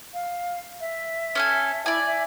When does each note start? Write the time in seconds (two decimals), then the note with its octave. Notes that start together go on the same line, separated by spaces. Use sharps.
0.14 F5
0.80 E5
1.35 C#4 A4 G#5
1.86 E4 D5 G#5
2.06 E5